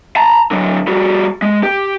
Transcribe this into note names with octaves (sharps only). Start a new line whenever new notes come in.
A5 A#5
D3 F#3
G3 F#4
G#3
G4